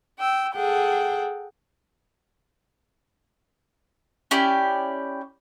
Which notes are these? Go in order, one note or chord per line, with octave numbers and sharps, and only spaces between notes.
G5 E6
G#4 A4 F#5 G5
C#4 E4 G4 D5